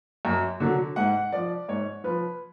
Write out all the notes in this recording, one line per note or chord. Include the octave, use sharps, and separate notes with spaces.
F#2
D3 F#3
G#2 F#5
F3 D5
G#2 C#5
F3 B4